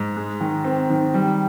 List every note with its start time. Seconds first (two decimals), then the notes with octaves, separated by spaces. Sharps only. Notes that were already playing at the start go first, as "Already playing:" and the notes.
Already playing: G#2
0.17 G#3
0.40 D#3
0.64 C4
0.90 D#3
1.14 G3